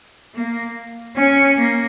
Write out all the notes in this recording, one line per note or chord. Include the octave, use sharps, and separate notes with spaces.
A#3
C#4
A#3